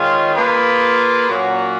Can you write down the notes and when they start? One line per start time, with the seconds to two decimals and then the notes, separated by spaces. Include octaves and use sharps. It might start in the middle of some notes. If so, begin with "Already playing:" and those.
Already playing: D#3 G#3 C#4 F4 G#4
0.33 A#3 F4 G#4 B4
1.27 A#2 F#3 A#3 C#4 F#4